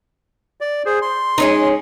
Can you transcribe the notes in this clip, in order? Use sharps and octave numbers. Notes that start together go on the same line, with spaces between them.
D5
G#4 C5
C6
G#3 C#4 D#4